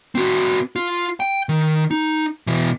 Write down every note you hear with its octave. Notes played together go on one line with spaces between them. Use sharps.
C4 F#4
F4
G5
D#3
D#4
B2 E3